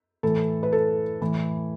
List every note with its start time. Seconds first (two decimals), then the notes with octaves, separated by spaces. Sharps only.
0.23 A2 E3 A4
0.63 B4
0.73 A4
1.21 A2 E3